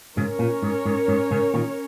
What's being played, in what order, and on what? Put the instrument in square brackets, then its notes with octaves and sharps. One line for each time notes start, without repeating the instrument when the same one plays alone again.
[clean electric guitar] G#2 C#3 [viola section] C#4 A#4 C#5
[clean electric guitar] A#2
G#2
G#2
G#2
G#2 C#3
A#2 D#3